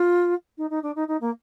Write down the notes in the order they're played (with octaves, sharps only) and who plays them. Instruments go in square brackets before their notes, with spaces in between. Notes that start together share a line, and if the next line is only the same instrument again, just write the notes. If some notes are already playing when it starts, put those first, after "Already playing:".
Already playing: [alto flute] F4
D#4
D#4
D4
D#4
D#4
A#3